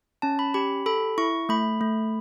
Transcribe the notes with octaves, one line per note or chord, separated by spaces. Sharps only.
C#4 A5
B5
G4 B5
A4 B5
E4 C#6
A3 B5
A3